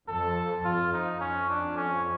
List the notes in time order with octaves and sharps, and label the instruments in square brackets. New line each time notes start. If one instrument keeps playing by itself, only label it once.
[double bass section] F2 [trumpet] A4
[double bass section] F2 [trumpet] F4
[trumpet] D#4
[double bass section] F2 [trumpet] C#4
[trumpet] D4
C#4